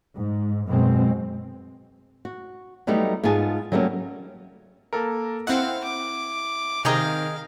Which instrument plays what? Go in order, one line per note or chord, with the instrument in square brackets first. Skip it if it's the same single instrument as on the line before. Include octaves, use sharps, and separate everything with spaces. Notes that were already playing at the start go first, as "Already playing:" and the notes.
[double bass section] G#2
F#2 B2 G#3 C4
[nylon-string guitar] F#4
F#3 G3 A3 B3 D#4
G#2 B3 F4 G#4 G#5 A5
F#3 G3 A3 A#3 C4 C#4
[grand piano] A#3 A4 A#4
[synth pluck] C4 F#5 [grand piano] E4 [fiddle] F5
[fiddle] D6
[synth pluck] C3 G5 A#5 [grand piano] D#3 [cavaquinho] G#4 A#4 D#5 [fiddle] F5